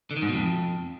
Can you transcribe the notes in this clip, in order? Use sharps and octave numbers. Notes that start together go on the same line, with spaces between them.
D3
D#3
G#2
B2
F2